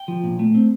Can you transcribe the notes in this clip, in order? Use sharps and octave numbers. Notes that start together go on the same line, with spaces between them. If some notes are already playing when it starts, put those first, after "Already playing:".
Already playing: G5
F3
A#2
A3
C4